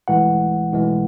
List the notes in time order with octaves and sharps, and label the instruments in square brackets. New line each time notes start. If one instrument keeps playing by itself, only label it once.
[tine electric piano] B1 A2 E3 G#3 F#5
B1 A2 E3 G#3